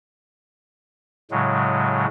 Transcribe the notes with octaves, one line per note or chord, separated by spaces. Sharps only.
A2 C#3 F#3 G#3